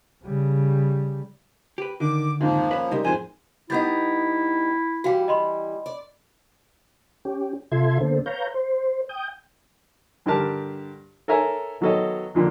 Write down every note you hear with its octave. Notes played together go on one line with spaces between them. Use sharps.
C#3 G3
G4 B4
D3 D#3 D6
F2 G#2 D#3 F3 A#3
C#4 B4 A5 B5
C3 G3 G#3 D#4 G4 A#4
F2 G#2 G#4 C5 G#5
G3 B3 D#4 E4 F#5 G6 A6
E3 G3 F#4 F5 G5
D#5 B5 C6
D5
C#4 G4
C3 F4 A4 E5 C6 G#6
D3 A#3 B3 D4 A4 C5
B4 C#5 F5 A#5 G6
C5
G5 D#6 G6
G2 D3 G4 A#4 A5 F6
A4 A#4 C#5 E5 G#5 A#5
D#3 F#3 B3 A4 C#5 D#5
F2 A#2 D3